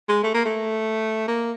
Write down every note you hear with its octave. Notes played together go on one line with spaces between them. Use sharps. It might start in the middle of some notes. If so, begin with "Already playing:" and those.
G#3
A3
A#3
A3
A#3